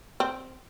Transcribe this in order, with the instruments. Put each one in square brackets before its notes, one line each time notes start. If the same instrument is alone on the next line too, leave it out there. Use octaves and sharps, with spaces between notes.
[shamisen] C4